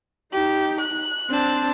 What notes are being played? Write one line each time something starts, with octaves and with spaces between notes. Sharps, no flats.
D#4 G4
F#6
C4 D4 A5